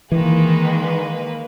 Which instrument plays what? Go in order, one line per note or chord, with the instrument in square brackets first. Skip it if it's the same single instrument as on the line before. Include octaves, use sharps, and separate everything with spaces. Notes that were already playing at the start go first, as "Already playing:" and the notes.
[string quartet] D#3 G#3 [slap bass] E3 [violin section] A#3 B4